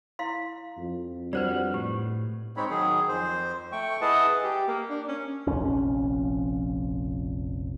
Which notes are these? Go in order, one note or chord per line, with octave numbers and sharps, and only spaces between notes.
E4 F5 C6
F2
G3 D4 F#4 B4 C5 D5
A2 G4
G#3 C4 D#4 C#5 B5
D#3 F#3 G#4
F2 C5
A3 G5 C#6
E4 G#4 B4 D#5 F#5 A5
G4
A#3
D4
C#4
F1 A#1 F2 C#4